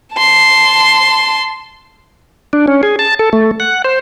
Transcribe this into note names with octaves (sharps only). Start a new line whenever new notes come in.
A5 C6
D4
C#4
G#4
A5
A4
A3
F#5
C5